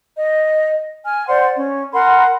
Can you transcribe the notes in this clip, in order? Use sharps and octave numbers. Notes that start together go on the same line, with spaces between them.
D#5
G#5 F6
C5 D5 F#5 C6
C#4
A#4 F#5 B5 C6